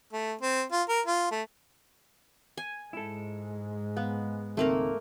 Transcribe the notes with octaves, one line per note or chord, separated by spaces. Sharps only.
A3
C4
F4
A#4
F4
A3
G#5
G#2 G#3 E4 A4
B3 F5
C#2 D#3 A3 A#3 C4 A#4